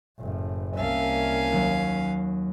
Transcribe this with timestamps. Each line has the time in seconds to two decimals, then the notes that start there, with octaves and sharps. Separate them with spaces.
0.19 F#1 A2
0.77 C2 A#3 C#4 E5 F5 A5
1.52 D#2 F#3